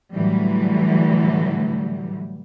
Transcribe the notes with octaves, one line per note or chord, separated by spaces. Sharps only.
A2 D3 E3 F#3 G3